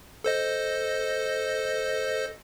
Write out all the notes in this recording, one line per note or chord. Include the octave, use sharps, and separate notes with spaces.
A4 C5 D#5